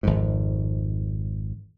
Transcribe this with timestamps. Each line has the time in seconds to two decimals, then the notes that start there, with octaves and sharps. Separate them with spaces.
0.03 G#1 F2 G#2